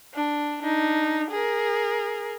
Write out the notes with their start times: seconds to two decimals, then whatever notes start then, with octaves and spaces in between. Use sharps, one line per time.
0.14 D4
0.62 D4 D#4
1.31 G#4 A#4